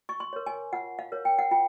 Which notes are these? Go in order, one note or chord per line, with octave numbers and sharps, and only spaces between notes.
C#6
C6
A#4 C#5
G#5
F4 F#5
F5
A#4 C#5
G5
F#5
F4 G5